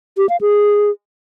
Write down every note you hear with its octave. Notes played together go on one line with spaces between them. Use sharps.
G4
F5
G#4